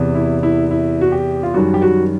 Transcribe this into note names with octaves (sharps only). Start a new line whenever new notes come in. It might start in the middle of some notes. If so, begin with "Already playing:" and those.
Already playing: E2 C3 E3
E4
E4
E4
F#4
G4
F4
F#2 D#3 G3 F#4
G4
F#4